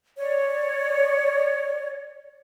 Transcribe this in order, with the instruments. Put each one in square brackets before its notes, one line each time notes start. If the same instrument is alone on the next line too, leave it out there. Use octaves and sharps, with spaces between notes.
[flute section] C#5 D5